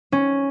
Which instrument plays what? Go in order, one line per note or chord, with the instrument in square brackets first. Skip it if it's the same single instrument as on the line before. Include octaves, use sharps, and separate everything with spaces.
[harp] C#4